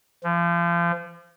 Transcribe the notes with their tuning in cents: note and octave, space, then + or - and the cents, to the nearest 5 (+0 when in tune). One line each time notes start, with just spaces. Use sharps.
F3 -35